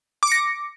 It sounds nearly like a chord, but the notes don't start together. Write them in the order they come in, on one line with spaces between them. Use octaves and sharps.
D6 C#7 A#6